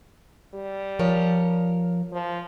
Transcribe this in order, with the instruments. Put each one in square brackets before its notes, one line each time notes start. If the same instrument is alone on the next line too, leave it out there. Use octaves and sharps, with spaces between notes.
[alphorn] G3
[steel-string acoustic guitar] F3 A#4 C#5
[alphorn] F3